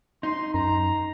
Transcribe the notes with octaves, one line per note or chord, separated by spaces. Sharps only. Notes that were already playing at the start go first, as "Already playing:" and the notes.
D#4 C6
F#2 A#5